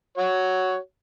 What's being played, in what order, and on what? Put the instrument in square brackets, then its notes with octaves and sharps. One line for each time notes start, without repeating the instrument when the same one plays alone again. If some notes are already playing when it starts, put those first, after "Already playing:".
[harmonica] F#4 C#5